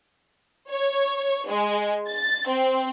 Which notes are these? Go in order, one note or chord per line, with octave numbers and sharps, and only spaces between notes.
C#5
G#3
A6
C4